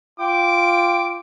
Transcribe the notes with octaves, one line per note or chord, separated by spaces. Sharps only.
F4 G5 D6